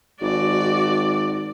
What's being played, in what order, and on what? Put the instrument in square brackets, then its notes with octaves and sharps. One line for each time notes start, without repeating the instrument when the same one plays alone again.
[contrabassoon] G#1 [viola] F#4 D5